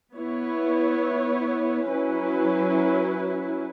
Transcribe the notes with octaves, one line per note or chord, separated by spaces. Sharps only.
B3 E4 C#5
F#3 C#4 E4 B4